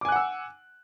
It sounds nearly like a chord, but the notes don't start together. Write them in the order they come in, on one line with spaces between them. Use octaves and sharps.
D6 G#5 F#6 F#5 E6